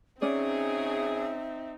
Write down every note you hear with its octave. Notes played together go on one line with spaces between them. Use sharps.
C#3 F#3 C4 C#4 D#4 G#4 D5 E5